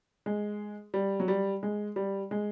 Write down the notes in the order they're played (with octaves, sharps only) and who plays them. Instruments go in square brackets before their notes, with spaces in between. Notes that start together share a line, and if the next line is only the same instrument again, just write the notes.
[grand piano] G#3
G3
F#3
G3
G#3
G3
G#3